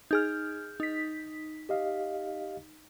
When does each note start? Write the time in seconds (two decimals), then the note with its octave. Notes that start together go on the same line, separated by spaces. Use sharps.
0.11 D#4 G#4 F6 G6
0.80 D#4 B6
1.69 G4 D#5 F5